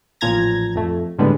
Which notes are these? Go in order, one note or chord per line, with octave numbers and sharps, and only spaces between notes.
A1 A#2 F3 A#5 G#6 A#6
F2 A3
A2 D3 G3 G#3 B3